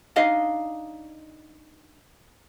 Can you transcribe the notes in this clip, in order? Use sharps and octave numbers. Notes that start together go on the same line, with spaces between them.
D4 D#4 D#5 F5